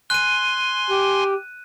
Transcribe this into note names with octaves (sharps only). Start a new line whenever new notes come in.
G#5 C6 F#6 D#7
G4